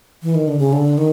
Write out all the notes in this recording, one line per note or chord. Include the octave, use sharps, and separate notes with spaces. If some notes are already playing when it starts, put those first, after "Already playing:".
E3
D#3
D3
C#3
D3
D#3